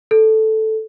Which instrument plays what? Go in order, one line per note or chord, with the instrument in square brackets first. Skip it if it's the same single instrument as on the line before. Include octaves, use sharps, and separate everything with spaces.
[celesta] A4